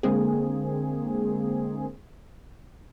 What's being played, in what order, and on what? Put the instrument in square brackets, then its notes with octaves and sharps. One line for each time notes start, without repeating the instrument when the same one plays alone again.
[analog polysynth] D3 G#3 A#3 C4 G#4